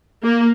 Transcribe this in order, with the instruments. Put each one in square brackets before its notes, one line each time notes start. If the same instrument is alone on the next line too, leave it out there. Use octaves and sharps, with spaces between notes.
[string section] A#3